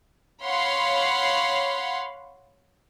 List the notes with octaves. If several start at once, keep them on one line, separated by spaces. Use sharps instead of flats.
C#5 F5 F#5 B5 C6